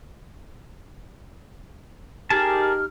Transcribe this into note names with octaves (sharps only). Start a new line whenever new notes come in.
D#4 G4 G#4 A#4 A5 F6